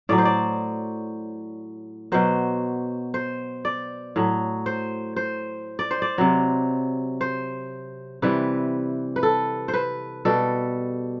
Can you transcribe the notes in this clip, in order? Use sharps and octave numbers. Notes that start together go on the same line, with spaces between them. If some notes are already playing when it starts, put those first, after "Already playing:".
A2 F#3 D5
C5
D5
B2 F#3 C5
C5
D5
A2 F#3
C5
C5
D5
C5
D5
C3 F#3
C5
C3 E3 G3 B4
B4
A4
C5
B4
B2 G3 A4